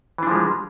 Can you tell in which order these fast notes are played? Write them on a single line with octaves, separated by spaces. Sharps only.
E3 D4 F3 G#3 G3